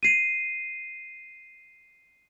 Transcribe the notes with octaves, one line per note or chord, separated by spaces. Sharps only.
C7 D#7